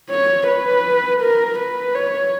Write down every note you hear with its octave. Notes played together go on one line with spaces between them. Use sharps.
C#5
B4
A#4
B4
C#5